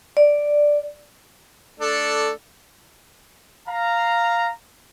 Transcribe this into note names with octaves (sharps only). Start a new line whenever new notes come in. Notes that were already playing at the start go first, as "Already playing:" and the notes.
D5
A3 D4 A4
F5 A#5